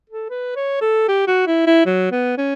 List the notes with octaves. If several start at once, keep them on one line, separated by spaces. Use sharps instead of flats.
A4
B4
C#5
A4
G4
F#4
E4
E4
F#3
B3
C#4